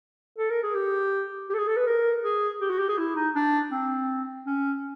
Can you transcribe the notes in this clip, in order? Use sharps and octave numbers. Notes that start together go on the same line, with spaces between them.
A4
A#4
G#4
G4
G4
A4
G#4
A4
B4
A#4
G#4
G4
F#4
G4
G#4
E4
D#4
D4
C4
C#4